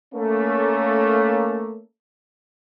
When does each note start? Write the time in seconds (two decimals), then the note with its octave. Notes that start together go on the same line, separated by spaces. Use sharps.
0.14 A3 A#3 C#4